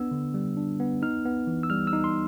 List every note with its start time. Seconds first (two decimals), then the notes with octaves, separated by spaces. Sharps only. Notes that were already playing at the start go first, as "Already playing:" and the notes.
Already playing: B3 D4 E6
0.12 D3
0.34 G3
0.57 D4
0.80 B3
1.02 D#4 F6
1.25 B3
1.47 E3
1.63 E6
1.70 G3 F6
1.87 E6
1.93 D#4
2.04 C6